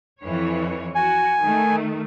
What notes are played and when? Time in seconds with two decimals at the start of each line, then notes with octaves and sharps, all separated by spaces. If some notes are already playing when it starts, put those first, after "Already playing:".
0.20 F2 E3 C#5
0.95 F#4 G#5
1.39 D#3 A3